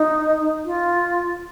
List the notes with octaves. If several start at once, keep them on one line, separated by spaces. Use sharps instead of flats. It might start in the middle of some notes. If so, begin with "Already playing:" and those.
Already playing: D#4
F4